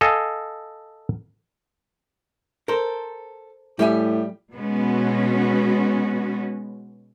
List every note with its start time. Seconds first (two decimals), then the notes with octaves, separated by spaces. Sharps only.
0.01 A4 D#5 F5 G#5
2.68 A4 A#4 C5
3.79 A2 G3 G4 E5 G#5
4.53 B2 G#3 B3 C#4 F#4